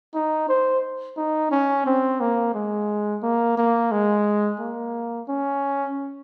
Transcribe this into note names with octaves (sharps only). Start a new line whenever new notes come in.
D#4
C5
D#4
C#4
C4
A#3
G#3
A#3
A#3
G#3
A#3
C#4